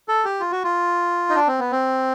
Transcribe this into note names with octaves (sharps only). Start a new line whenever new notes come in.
A4
G4
F4
F#4
F4
D#4
D4
C4
B3
C4